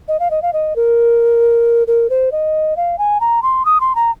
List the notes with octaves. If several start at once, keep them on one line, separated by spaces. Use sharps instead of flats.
D#5
F5
D#5
F5
D#5
A#4
A#4
C5
D#5
F5
G#5
A#5
C6
D#6
C6
A#5